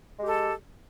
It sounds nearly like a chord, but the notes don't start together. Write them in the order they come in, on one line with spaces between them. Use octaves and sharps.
G#3 G4 A4